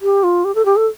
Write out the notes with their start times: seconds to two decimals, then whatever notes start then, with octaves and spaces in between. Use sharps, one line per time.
0.02 G4
0.23 F4
0.45 G4
0.55 A4
0.65 G4
0.76 A4